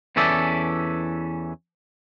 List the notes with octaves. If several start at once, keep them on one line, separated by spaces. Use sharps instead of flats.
E2 E3 C#4 A4 D5 E5